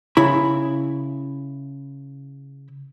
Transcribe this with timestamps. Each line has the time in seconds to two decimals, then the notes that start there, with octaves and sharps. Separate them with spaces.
0.17 C#3 E4 B5